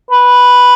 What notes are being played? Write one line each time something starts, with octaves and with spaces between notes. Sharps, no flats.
B4